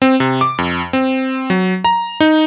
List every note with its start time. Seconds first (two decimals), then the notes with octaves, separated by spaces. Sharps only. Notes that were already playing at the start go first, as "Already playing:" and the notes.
0.02 C4
0.20 C3
0.41 D6
0.58 F2
0.93 C4
1.50 F#3
1.84 A#5
2.20 D#4